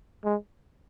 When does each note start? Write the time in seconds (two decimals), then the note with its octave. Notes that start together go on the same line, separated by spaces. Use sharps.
0.24 G#3